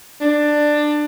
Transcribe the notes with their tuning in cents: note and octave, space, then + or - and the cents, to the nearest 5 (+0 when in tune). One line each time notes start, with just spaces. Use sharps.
D4 +15